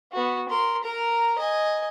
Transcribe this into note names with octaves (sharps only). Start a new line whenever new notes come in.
B3 F#4
A#4 C6
A#4 A#5
D#5 G#5